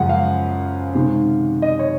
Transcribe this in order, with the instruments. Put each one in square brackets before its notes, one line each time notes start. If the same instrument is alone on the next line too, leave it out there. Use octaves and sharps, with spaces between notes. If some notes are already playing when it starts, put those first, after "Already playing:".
Already playing: [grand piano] F#2 C#3 F3 G#3 F#5
F5
C3 D#3 G#3
D#5
C#5